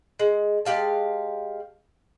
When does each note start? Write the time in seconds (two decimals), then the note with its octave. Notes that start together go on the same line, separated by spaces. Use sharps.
0.19 G#3
0.65 G#3 G4 F5 A5